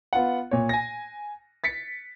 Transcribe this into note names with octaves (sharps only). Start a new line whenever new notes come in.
B3 F4 F#5
A#2 C#5
G#5 A#6
A6 B6 C#7